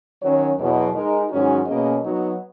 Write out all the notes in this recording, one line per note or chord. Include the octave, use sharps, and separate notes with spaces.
D#3 F#3 C#4 F#4 C#5
E2 B2 F#3
G#3 D#4 A#4
G#2 D#3 F#3 C#4 F#4
B2 A#3 C#4 G#4 D#5
F#3 B3 D#4 F#4